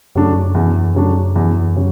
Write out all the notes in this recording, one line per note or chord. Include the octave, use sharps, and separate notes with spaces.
F#2 C#3 F#3 A3 D4
E2
C#3 F#3 A3 D4
E2
C#3 F#3